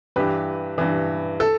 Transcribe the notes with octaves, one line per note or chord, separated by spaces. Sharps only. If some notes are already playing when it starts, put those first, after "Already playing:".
G2 E3 G4 B4
G2 E3
A4